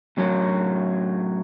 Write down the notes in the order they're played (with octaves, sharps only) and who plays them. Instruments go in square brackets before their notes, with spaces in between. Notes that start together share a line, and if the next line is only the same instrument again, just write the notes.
[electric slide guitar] A2 F#3 C#4